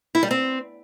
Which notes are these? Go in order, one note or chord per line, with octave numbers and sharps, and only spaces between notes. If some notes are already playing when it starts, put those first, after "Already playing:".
E4
G3
C4